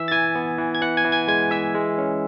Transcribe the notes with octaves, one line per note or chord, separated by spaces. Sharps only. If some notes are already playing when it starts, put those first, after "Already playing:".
Already playing: E3 E5 E6
A6
E3 G#5 G#6
B3
E3
G#6
E3 F#5 F#6
G#5 G#6
E3
G#5 G#6
G#3 G#5 G#6
E3 E5 E6
G#3
C#4